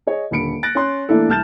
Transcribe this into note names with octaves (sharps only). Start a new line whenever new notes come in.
G#4 C#5 D#5
D#1 D3 B5 C#7 D7
F#6 A6 A#6 D7
C#4 C6 F#6
E3 A3 A#3 D4 E4 A4
C2 A5 F6 G6 A6 E7